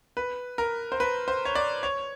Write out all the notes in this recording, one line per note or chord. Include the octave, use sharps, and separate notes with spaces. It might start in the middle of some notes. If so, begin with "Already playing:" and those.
B4
A#4
C5
B4
C5
C#5
D5
C#5